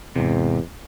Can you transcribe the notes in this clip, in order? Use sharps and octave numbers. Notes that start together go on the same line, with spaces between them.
E2 G#2 C3